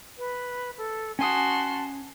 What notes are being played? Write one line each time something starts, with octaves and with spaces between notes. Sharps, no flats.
B4
A4
C#4 F#4 G#5 A5 C6 D#6